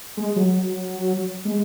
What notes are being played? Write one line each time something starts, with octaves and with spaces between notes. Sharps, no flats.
G#3
F#3
G#3